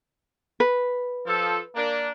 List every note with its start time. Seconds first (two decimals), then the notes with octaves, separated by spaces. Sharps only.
0.60 B4
1.26 F3 A4
1.75 A#3 D4